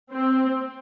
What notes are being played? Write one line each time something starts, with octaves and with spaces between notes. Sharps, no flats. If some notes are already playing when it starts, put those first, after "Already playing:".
C4